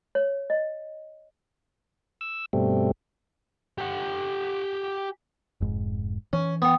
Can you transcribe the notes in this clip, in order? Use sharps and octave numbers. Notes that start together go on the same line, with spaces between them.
C#5
D#5
E6
G2 B2 G3 A3 C4
G4 F#5
F1 G#2
E3 C#4
B3 G5 D#6